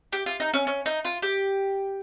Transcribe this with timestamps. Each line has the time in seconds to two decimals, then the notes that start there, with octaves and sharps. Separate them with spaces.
0.13 G4
0.26 F4
0.40 D#4
0.54 C#4
0.67 C#4
0.86 D#4
1.05 F4
1.22 G4